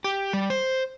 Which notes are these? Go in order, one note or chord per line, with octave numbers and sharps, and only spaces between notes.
G4
G3
C5